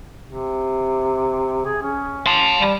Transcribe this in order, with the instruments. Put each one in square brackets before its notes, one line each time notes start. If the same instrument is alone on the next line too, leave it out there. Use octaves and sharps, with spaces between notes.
[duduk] C3
G#4
C#4
[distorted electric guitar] A5 C6
[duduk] G3